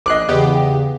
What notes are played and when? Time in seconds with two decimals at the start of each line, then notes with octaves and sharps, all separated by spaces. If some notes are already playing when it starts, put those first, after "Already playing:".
0.06 A#1 D#5 D6 F#6 C7
0.28 E2 C#3 B3 G4